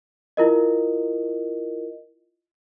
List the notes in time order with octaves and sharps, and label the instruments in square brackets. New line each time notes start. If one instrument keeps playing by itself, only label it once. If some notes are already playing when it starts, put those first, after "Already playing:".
[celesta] E4 F4 A#4 D#5